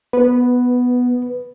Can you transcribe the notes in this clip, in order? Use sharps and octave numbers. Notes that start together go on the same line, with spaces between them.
B3 B4